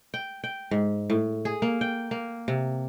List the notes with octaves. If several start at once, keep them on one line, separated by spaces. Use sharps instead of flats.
G5
G5
G#2
A2
G#4
A#3
G5
A#3
C3